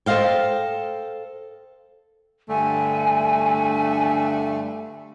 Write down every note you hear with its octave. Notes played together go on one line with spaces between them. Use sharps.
A4 C5 D#5 F5 G5
G2 D3 A3 G#5